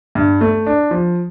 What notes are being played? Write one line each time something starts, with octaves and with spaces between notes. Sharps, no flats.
G2
A3
D4
F3